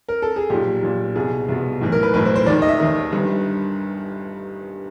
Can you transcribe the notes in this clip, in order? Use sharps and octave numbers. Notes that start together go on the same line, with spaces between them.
A#4
A4
G#4
B1 A#2 G4
B1 A#2
C2 B2 G#4
C2 B2
B1 A2 E3
A#4
B4
B1 A2 E3 B4
C5
C5
D#2 D#3 D5
D#5
E5
D#2 D#3
G1 G2 D#3